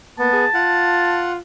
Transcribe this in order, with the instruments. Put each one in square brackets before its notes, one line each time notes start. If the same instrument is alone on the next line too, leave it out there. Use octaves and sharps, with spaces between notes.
[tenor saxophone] A#3 [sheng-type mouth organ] B3 [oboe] A5
[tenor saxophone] G#4
[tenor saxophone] F4 [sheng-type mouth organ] F#5